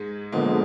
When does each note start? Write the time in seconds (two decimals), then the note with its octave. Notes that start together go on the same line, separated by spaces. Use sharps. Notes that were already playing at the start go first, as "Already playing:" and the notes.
Already playing: G#2 G#3
0.32 A#2 D3 F3 G#3 A#3 B3